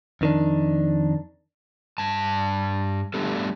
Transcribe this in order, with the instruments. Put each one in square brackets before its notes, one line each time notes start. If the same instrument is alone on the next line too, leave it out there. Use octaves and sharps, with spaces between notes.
[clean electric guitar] F2 D#3 D4
[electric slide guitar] G2 A5
G3 A3 B3 D4 G4 A4